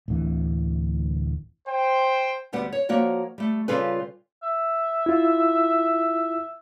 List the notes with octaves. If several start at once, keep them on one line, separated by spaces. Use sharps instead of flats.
D1 D2 D3 E3
C5 G5
D2 G3 B3 G4 F#5
C#5
F3 A#3 F#4 C#5 D5
G3 A3
C#3 G3 F4 G#4 A4 B4
E5
E4 F4